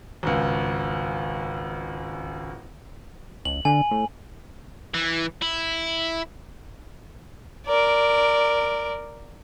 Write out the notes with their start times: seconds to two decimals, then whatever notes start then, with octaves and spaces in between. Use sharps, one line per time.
0.23 G#1 C#2
3.45 C#2 F#7
3.65 D3 G#5
3.91 A2
4.94 E3
5.42 E4
7.66 A#4 D5